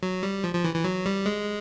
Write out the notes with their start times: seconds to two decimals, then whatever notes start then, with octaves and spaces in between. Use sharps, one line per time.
0.03 F#3
0.23 G3
0.44 F3
0.54 F3
0.64 E3
0.75 E3
0.84 F#3
1.06 G3
1.26 G#3